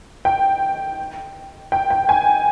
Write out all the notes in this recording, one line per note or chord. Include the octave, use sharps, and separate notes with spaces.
G5
G5
G5
G#5